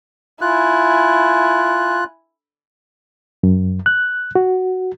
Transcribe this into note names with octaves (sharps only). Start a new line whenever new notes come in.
E4 F4 G#5 F#6
F#2
F#6
F#4